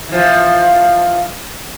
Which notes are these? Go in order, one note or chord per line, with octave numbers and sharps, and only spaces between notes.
E3 F3